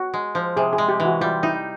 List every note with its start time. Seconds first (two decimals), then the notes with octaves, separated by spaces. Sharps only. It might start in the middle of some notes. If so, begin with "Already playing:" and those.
Already playing: F#4
0.14 G#3
0.35 F3
0.57 C3 G#4
0.73 G#4
0.78 G#3
0.89 G4
1.00 E3
1.05 F#4
1.21 G3 F4
1.43 D#4 E4